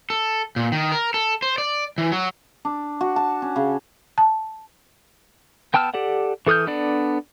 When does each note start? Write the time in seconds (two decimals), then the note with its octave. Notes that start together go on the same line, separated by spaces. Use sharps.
0.10 A4
0.56 A#2
0.72 D#3
0.92 A#4
1.14 A4
1.42 C5
1.58 D5
1.98 E3
2.12 F#3
2.65 D4
3.01 F#4
3.16 A5
3.42 C#4
3.56 C#3
4.18 A5
5.74 B3 G5 A5 E6 F6
5.94 G4 A4 D5 F#5
6.47 E3 A4 D#6 F6 G6
6.67 B3 D4 A4 D5